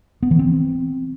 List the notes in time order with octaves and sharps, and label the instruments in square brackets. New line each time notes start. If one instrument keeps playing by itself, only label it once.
[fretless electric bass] B3
E3
C4